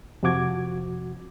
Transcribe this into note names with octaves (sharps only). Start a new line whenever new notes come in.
F2 C3 F3 F#4 D6 G#6